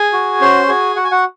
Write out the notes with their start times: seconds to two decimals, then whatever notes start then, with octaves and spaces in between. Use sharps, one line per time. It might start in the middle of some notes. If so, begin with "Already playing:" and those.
Already playing: G#4 G#5
0.13 F#4
0.41 C#4 C5 C6
0.68 F#4 G#4 G#5
0.96 F#4 F#5
1.04 G#5
1.11 F#4 F#5